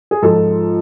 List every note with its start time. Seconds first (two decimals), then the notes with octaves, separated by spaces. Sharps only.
0.11 G#4
0.22 G#2 F3 A4